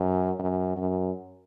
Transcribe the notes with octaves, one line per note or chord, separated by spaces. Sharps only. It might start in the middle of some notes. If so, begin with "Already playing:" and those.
Already playing: F#2
F#2
F#2